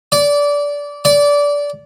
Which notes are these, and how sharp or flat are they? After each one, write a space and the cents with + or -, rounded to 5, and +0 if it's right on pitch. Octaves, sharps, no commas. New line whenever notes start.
D5 -20
D5 -20